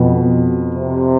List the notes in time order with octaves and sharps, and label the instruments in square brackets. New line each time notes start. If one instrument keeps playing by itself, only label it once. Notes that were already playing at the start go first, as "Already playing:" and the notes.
Already playing: [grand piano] F2 B3 [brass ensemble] B2
[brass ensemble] C3